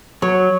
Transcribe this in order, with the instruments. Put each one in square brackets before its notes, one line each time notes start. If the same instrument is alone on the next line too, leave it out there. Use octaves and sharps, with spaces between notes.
[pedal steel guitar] F#3 [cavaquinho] C#5